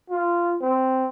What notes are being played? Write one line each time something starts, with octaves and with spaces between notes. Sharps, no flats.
F4
C4